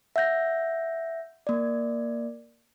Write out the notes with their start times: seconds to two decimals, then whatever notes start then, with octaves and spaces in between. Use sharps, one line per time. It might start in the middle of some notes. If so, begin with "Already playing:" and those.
0.16 E5 F#5 G6 A#6
1.47 A#3 D5